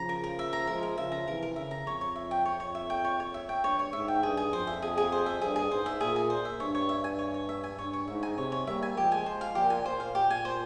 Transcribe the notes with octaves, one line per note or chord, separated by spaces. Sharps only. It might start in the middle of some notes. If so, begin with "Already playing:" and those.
Already playing: C#3 F3 A#5
A#4
A#4
E5
A#5
F3 G#3 A#4
A#4
C#3 F3 E5
A#5
C3 E3 A#4
A#4
C#3 E5
A#5
F2 C#5
C#5
E5
G5
C#5
C#5
E5
G5
C#5
C#5
E5
G5
G2 C#5
C#5
G#2 E5
G5
G2 G#4
G#4
F2 C5
E5
G#4
G#4
C5
E5
G2 G#4
G#4
G#2 C5
E5
A#2 G#4
G#4
C5
E5
G2 C#5
C#5
E5
G#5
C#5
C#5
E5
G#5
G2 C#5
C#5
G#2 E5
G#5
C3 C#5
C#5
G3 A#3 E5
G#5
F3 G#3 G4
G#5
C5
F5
A#2 G4
G#5
A#2 C5
F5
G4
G#5
C5